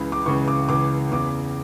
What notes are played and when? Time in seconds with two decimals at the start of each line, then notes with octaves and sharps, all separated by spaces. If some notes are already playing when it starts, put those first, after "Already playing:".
Already playing: C#2 C#3 E3 B5
0.12 D6
0.26 C#2 C#3 E3 C#6
0.48 D6
0.69 C#2 C#3 E3 D6
1.12 E2 C#3 E3 D6